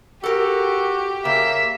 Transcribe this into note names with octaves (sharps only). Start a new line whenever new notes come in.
F#4 G4 A4 A#4
C#3 A#3 E5